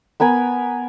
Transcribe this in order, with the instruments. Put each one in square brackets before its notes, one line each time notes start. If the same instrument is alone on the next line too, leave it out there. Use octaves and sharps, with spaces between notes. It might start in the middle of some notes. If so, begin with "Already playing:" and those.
[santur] B3 A#4 G#5 B5